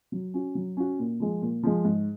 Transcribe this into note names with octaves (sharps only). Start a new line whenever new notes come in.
F#3
C#4 F#4
F#3
C#4 F#4
A#2
F3 G#3
A#2
F3 G#3
G#2